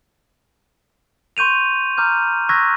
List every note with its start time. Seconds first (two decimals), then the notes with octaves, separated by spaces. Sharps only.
1.37 C6 C#6 G6 D#7 F7
1.98 A#5 D6 F6 G6
2.49 C#6 E6 F#6 G#6 A#6 B6